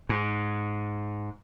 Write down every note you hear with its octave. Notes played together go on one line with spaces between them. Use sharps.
G#2